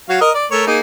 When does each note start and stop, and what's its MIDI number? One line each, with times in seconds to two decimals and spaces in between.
0.09 0.17 54
0.09 0.17 66
0.09 0.17 77
0.21 0.30 70
0.21 0.30 75
0.21 0.30 87
0.34 0.46 74
0.52 0.63 57
0.52 0.63 70
0.52 0.63 73
0.67 0.80 58
0.67 0.80 63
0.67 0.80 68